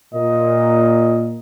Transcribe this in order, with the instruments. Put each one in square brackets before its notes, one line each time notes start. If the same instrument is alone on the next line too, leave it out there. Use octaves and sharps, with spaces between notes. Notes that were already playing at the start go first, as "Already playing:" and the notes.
[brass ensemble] A#2 [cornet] D#5